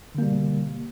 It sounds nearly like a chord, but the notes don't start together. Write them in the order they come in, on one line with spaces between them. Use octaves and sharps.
D3 A#3 G3 B2